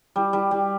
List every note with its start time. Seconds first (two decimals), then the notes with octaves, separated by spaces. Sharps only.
0.16 G3
0.33 G3
0.51 G3